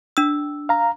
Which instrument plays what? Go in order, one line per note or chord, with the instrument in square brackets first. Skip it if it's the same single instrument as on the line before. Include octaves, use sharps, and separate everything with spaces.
[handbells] D4 E6
[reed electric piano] F5 A#5